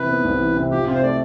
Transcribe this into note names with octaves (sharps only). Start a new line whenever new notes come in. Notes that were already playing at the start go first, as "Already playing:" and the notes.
Already playing: C3 E3 B4
B3
C2
E3
C3
F3 G4
C3 F4
C5
A3 D5